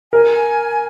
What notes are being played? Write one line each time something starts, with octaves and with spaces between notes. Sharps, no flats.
A#4 G#5